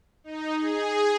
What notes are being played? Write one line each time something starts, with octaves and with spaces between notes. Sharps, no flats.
D#4
G#4